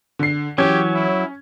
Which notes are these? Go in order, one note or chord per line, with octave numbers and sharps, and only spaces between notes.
D3 C7
E3 F#3 C#4 G4 G#6
E4